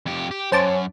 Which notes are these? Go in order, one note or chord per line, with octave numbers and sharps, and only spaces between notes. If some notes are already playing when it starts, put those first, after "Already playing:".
F2 G4
G4
F#2 C#4 C5 A5 D6